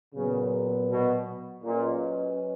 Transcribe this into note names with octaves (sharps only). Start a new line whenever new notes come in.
A#2 C#3 F#3 B3
B2
A#2 F#3 C#4 G#4 B4 D#5